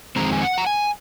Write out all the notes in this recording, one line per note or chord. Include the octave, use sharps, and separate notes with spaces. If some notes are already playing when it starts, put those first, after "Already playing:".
F2 D#3 G#3 C4 A#5
G#5
F#5
A#5
G#5